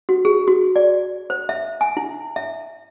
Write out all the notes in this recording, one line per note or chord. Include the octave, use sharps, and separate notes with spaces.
F#4
G#4
F#4
D5
C5
E5
G#5
E4
E5